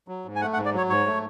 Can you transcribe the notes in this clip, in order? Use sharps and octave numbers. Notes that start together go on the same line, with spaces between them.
F#3
G#2
G#5
A3 F#5
F#5
G#2
D5
F#3 C#5
G#2 C#5
A3